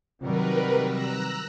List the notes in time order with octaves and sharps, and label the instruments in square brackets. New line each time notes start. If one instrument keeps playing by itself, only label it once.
[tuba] C3 [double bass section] D#3 F#3 G3 [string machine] A#4 B4
[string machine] A#5 E6 F#6